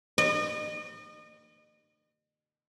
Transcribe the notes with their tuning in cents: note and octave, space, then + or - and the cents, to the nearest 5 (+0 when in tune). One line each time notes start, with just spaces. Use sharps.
D#5 -40